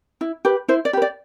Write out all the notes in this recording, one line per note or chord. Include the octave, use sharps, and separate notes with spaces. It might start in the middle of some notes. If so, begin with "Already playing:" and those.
E4
G4 B4
E4 C5
D5
G4 B4
D5